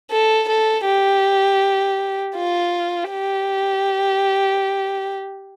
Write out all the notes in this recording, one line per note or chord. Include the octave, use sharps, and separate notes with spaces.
A4
A4
G4
F4
G4